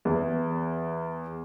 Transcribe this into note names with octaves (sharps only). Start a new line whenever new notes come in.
E2